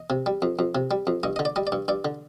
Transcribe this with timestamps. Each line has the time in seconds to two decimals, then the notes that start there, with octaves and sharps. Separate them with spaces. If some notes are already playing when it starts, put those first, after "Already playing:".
Already playing: D#5
0.10 C3
0.26 G3
0.42 F2
0.59 F2
0.75 C3
0.91 G3
1.07 F2
1.23 G2 D#5
1.36 D3 D#5
1.45 D5
1.56 G3 D#5
1.67 D5
1.72 G2
1.88 G2 D5
2.05 D3